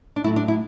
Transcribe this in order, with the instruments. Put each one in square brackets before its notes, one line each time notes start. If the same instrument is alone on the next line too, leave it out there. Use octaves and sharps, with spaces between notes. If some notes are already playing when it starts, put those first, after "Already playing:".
[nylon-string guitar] D4
A2 F#3 A3 E4
D4
E4